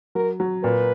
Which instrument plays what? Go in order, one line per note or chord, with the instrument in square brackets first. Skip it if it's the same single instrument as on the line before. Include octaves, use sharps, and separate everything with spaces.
[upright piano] F#3 [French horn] A#4
[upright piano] F#3
[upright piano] A#2 [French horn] B4